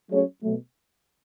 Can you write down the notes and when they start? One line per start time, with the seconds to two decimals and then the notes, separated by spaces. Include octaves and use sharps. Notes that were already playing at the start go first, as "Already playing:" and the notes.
0.10 F#3 A3 C#4 G#4 C#5
0.42 B2 F#3 A3